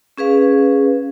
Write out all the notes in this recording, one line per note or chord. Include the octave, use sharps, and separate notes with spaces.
C#4 G#4 B4 F5